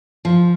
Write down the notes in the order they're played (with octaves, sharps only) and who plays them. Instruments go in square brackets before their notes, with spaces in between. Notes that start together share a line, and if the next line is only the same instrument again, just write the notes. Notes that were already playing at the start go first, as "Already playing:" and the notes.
[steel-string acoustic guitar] F3